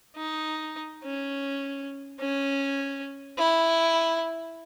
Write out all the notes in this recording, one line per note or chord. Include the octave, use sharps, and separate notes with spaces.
D#4
C#4
C#4
E4